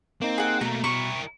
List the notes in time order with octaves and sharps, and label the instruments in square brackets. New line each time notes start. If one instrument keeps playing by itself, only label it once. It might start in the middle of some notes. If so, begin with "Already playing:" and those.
[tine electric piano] A#3 D#4 [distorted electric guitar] C4
[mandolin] G#4 F#5
[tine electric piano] B2 [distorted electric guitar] A3 A#3 [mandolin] A#5
[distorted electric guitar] E4 A#4 [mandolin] C#6